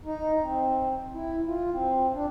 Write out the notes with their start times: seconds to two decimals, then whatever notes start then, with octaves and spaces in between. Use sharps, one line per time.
0.05 D#4
0.43 C4
1.14 E4
1.46 F4
1.72 C4
2.14 D4